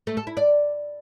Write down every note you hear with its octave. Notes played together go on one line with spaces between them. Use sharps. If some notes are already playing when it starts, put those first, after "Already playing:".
A3
A4
E4
D5